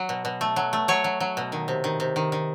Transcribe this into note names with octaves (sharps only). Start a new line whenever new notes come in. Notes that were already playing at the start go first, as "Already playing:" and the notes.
Already playing: F#3
B2
B2
A3
F#3
A3
F#3 C#5
F#3
F#3
B2
D#3
C3
D#3
C3
D#3
D#3